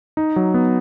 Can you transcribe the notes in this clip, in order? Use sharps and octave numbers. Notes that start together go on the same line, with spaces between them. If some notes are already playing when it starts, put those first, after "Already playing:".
D#4
F#3
B3